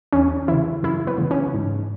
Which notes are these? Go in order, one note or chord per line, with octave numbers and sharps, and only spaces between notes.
E2 C#4
C#3 E3 E4
F#2 E4
B3
C#3 E3
C#4
G#2